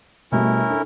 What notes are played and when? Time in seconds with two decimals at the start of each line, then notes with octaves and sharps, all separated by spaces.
0.32 B2 G3 A3 C#4 E4 A#4
0.69 D4 A4